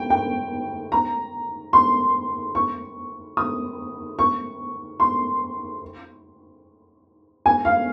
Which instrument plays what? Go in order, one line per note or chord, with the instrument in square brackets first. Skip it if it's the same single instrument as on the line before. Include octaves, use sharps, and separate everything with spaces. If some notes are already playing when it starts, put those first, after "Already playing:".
Already playing: [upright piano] G5
G5
A#5
C6
C#6
D#6
C#6
C6
G#5
F5